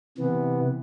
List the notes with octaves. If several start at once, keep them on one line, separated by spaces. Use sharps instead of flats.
C3 E3 B3